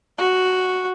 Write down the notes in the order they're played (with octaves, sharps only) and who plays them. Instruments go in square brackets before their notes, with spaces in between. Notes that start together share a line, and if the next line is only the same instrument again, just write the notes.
[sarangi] F#4